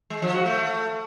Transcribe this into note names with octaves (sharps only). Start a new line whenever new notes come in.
G#3
F3
F#4
A3
A3